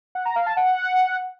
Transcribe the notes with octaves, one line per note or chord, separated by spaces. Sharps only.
F#5
A#5
F5
A5
F#5